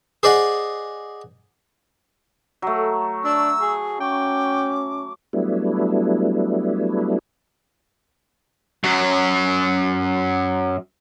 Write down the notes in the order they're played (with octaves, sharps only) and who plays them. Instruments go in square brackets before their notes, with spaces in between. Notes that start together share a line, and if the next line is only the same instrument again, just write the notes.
[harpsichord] G#4 C5 D5 D#5 F#5
[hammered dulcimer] F#3 A3
[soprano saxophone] D4 [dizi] E6
[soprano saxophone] G#4
[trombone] C#4 [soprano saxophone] G5 [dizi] D6
[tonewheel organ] F#3 G3 A3 B3 D4 E4
[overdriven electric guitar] F#2 F#3